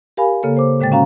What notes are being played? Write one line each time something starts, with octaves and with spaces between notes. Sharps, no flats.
G4 A#4 F5 G#5 B5
C#3 A#3 A4
C5 D6
A2 D3 G#3 G5 A6
C#4 F#4 F5 A#5